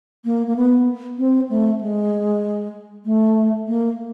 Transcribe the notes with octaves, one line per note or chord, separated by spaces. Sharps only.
A#3
A#3
B3
C4
A3
G#3
A3
A#3